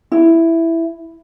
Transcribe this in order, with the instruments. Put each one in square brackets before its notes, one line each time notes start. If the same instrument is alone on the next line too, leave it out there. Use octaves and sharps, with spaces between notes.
[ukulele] E4